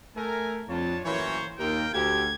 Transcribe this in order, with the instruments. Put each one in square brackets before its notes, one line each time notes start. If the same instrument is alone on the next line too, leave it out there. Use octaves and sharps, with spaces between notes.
[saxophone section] A3 [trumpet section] A#4 [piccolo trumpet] G#5
[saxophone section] F2 [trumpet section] D4 F4 C#5 [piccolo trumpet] A5
[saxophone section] F#2 A2 E3 [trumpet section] A#3 A#4 C#5 [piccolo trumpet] C5
[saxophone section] D#2 [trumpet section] F4 A#4 [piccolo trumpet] G5
[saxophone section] D2 [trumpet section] G4 [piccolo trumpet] G#6